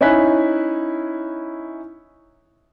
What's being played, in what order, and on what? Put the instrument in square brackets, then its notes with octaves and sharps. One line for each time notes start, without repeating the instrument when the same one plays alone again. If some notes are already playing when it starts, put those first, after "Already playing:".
[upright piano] C#4 D#4 E4 G#5 F#6 B6